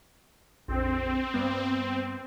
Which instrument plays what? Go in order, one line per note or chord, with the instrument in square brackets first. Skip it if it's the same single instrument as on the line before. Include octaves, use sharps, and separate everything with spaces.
[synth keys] A#1 F2 [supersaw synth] C4
[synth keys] G2 G3 B3